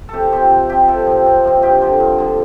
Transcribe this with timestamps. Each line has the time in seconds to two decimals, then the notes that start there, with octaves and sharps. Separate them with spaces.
0.09 C3 G4 A4
0.32 F3 C4 G4
0.50 C3
0.69 F3 C4 G4
0.88 C3 A4
1.07 F3 C4
1.26 C3
1.44 F3 C4
1.63 G2 G4
1.81 D3 F3
2.00 G2
2.18 D3 F3